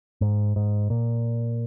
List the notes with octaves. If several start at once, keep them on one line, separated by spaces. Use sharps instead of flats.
G#2
G#2
A#2